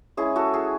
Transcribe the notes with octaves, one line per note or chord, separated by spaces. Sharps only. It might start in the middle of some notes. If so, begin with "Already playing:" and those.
G#3 C#4 E4 G#4
F#4 A4
G#4